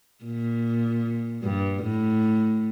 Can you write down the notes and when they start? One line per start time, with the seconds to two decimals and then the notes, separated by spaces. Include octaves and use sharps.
0.24 A#2
1.43 G2
1.83 A2